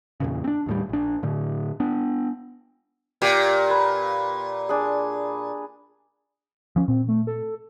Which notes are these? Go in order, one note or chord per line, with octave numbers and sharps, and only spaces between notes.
E2 A#2 C#3
C4 D4
D#2 A2 G3
A#1 D4
A2 D3
B3 D4
A#2 G4
B4
D4 G#4
F3 C#4
A#2 C4
A3
A4